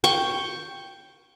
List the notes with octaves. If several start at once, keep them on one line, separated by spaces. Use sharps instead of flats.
G5 C#6